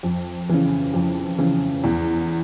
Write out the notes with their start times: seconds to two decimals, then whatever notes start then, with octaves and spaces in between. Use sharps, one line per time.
0.03 F2
0.49 C#3 E3
0.94 F2
1.38 C#3 E3
1.84 E2